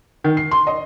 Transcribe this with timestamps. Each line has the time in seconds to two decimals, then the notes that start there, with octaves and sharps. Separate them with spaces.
0.24 D#3
0.37 C7
0.51 C6
0.67 D#5